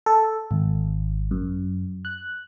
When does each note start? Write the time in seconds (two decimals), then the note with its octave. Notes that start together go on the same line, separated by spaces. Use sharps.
0.06 A4
0.51 G#1
1.31 F#2
2.05 F#6